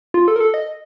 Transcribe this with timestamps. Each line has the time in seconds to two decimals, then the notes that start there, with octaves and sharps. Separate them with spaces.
0.14 F4
0.28 A4
0.36 A#4
0.40 A4
0.54 D#5